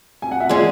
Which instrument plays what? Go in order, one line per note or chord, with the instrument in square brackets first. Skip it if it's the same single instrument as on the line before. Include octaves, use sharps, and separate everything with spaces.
[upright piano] G#5
F#5
E5
[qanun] G#3 C#4 G#4 [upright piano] D5